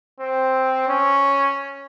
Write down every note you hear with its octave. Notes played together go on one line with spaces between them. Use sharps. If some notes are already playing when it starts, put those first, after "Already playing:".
C4
C#4